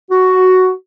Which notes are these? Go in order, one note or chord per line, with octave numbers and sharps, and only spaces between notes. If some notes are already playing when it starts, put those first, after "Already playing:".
F#4